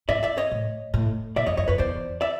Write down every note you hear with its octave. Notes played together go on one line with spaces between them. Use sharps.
G#2 D5 E5
D5 E5
C#5 D#5
A2
A2
A#2 D5 E5
E2 C#5 D#5
F2 C#5 D#5
F2 B4 C#5
E2 C5 D5
D5 E5